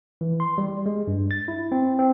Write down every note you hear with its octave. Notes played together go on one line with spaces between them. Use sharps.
E3
C6
G3
G#3
G2
A6
E4
C4
C4